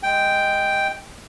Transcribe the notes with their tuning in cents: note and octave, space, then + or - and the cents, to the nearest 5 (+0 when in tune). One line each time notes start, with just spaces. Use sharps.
G#3 +0 G5 +0